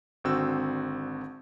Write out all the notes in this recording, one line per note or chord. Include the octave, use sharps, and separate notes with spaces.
G#1 D3 C4 F#4 E6